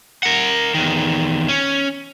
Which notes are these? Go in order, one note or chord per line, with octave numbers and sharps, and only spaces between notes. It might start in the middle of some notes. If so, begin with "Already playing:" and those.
A#4 F#5
E2 D#3
C#4